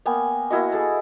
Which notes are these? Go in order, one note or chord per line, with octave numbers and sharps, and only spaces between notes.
A#3 B3 G5 G#5
A#3 E4 F#4 D#5
G#4 A4 A5